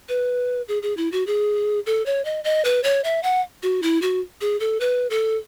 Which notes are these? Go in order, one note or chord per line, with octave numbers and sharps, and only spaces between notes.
B4
G#4
G#4
E4
F#4
G#4
A4
C#5
D#5
D#5
B4
C#5
E5
F#5
F#4
E4
F#4
G#4
A4
B4
A4